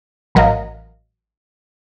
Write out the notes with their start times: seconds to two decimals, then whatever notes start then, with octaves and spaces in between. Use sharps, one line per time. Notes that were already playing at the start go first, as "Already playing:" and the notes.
0.35 A1 F#3 A#4 D#5 F5